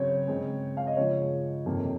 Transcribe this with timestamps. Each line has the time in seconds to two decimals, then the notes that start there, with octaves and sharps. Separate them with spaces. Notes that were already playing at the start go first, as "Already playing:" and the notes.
Already playing: C#3 F#3 C4 C#5
0.28 C#3 G#3 C4
0.77 F5
0.87 D#5
0.97 C#3 F3 G#3 C#5
1.66 F2 C3 D#3 A#3